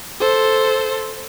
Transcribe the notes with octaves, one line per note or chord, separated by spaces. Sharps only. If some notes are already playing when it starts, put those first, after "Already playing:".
A4 C5